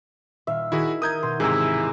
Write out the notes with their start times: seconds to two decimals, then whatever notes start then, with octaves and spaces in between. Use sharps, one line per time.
0.47 D#1 E5 F5
0.72 D#3 E4 F#4 G#4 B6 E7
1.02 A#4 D#6 G6 G#6
1.23 B2 C6
1.40 E1 G#2 C3 E4 G#4 G#5 A#5 E6